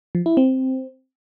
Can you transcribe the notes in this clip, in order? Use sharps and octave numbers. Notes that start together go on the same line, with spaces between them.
F3
E4
C4